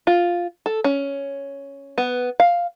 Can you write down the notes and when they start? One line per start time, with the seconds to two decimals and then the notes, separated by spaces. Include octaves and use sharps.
0.07 F4
0.66 A4
0.84 C#4
1.98 B3
2.40 F5